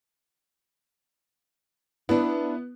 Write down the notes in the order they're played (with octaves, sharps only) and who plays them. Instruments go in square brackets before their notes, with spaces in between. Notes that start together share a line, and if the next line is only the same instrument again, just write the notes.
[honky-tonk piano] B3 [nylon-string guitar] D4 E4